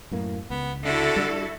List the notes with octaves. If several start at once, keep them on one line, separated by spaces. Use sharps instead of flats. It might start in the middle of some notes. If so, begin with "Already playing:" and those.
F#2 A2 A#3
C#2 B3
D3 E4 F#4 A4
G3 A#3 D4